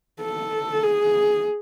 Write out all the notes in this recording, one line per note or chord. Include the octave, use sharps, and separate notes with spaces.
A4
G#4